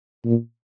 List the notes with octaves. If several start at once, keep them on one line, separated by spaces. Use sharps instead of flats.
A#2